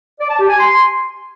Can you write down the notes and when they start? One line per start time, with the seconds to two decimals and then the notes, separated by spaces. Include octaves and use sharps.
0.20 D5
0.30 A5
0.40 G4
0.50 G#5
0.60 C6